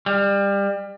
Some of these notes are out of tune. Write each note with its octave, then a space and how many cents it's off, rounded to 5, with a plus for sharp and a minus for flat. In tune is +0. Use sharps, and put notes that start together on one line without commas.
G3 +25